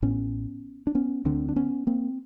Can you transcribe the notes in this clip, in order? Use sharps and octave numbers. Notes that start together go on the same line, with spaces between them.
A1 A2 B3 C#4
D4
B3 C#4
D2 D3 C4 D4
D4
B3 C#4
A#3 C4